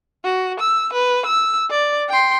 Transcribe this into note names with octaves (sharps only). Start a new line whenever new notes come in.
F#4
E6
B4
E6
D5
G5 C6